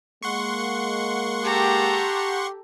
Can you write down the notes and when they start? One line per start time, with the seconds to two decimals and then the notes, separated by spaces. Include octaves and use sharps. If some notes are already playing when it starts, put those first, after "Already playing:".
0.23 G#3 A#3 F#5 C6 C#6
1.44 G4 A4 A#5